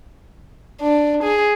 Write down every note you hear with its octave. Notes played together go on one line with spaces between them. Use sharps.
D4
G#4